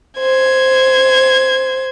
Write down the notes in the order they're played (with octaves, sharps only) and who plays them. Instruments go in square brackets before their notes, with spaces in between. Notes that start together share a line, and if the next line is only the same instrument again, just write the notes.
[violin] C5 G#6